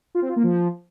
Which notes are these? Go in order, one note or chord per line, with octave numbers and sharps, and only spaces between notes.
F4
C4
F4
A#3
F3